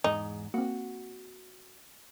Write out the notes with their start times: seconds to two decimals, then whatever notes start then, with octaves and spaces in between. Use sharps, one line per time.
0.04 E2 G#2 D#4
0.54 A#3 C4 F#4